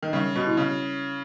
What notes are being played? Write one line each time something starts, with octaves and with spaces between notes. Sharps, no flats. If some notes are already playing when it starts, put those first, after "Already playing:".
D#3
C#3 G3
B2
E4
C#3